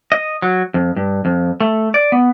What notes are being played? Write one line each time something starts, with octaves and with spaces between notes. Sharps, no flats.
D#5
F#3
F2
G2
F2
A3
D5
B3